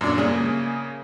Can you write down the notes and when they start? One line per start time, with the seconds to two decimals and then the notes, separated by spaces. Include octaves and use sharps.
0.01 F#2 A#2 D4
0.18 C#3 A#3 G#4 E5